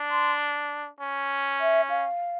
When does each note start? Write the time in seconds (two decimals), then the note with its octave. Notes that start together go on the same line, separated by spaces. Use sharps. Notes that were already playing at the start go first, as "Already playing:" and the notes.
Already playing: D4
0.11 C6
1.00 C#4
1.61 E5
1.90 F5